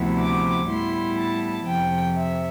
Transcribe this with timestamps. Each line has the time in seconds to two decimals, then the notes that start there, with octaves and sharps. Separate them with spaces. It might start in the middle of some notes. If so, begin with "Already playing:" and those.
Already playing: D2 C3 F3 B3 E4
0.19 D6
0.68 A2 G3 B3 E4 C6
1.18 A5
1.66 F2 C3 F3 G5
2.15 E5